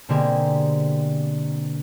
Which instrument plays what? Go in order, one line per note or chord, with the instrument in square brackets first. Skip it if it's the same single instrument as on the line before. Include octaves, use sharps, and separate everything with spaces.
[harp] B2 D3 A#3 C4 G4 G#4